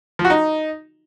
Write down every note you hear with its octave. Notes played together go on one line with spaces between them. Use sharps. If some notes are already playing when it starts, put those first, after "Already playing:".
F3
F#4
D#4